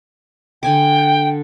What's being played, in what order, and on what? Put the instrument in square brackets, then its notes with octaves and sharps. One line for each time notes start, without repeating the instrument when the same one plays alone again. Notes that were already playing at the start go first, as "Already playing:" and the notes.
[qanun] D3 G#5 D6 [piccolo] G5